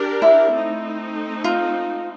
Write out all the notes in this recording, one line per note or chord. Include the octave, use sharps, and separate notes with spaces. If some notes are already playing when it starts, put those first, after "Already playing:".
Already playing: D4 G4 A#4 D5
E4
A3 C4 D#4
F4